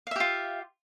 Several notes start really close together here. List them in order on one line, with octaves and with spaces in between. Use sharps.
F5 E5 G4 F4